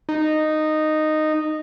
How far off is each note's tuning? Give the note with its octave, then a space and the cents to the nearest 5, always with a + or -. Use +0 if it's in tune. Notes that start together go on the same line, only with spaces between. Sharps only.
D#4 -10